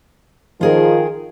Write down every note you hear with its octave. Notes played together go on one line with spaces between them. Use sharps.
D#3 F3 F4 G#4 A#4